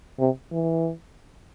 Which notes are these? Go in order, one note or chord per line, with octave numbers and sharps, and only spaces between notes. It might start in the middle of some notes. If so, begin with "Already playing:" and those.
C3
E3